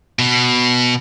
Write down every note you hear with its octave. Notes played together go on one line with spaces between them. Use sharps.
B2